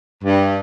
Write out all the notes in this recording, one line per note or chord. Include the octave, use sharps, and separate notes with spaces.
G2